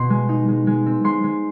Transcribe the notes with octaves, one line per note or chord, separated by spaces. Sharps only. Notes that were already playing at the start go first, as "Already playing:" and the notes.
Already playing: B2 C6
G#3
D#4
G#3
G#3
C4
G#3 C6
G#3